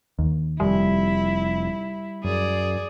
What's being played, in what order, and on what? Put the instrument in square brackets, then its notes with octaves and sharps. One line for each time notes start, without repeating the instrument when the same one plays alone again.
[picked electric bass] D#2
[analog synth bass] F1 [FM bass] G3 [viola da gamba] E4
[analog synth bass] F#2 [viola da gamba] G#4 D5